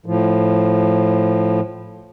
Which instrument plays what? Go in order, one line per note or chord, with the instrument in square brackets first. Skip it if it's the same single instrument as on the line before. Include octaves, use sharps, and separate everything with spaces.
[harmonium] A2 F3